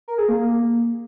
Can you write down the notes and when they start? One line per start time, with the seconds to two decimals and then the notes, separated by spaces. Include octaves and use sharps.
0.08 A#4
0.18 G#4
0.29 A#3